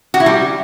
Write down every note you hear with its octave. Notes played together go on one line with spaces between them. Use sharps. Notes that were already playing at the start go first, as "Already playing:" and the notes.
F#4
E4
G3